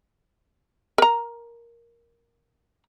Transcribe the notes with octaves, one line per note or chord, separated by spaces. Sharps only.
A#4 A#5